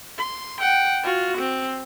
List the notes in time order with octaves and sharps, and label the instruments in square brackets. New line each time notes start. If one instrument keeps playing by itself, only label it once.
[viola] C6
F#5 G5
F4 F#4
C4